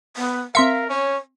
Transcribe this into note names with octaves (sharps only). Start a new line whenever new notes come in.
B3
C4 A#4 E5 F5 C6 C#7
C#4 C#5